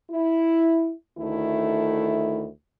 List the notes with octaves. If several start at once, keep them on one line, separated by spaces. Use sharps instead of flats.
E4
D2 D#3 A3 E4